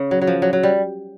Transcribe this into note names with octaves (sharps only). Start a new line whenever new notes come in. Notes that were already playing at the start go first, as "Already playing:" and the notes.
Already playing: C#3
F#3
F#3
F3
F#3
F#3
G3